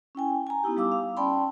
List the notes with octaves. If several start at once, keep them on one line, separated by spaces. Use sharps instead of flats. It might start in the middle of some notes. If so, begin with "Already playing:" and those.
C#4 E4 G5 G#5
G#5 A#5
B3 D#4 E4 G4
G3 D#4 F5 D6 E6
F5
C#4 D5 G5 A5 B5 C6